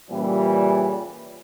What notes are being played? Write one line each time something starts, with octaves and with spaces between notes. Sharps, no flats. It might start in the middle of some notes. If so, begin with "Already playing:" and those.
A#2 C#3 E3 G3